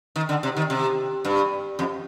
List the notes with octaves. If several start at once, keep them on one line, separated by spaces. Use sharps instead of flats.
D#3
D3
C3
D#3
C3
G2
F2